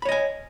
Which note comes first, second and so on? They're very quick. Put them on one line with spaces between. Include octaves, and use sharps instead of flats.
B5 C#5 D#5 G#5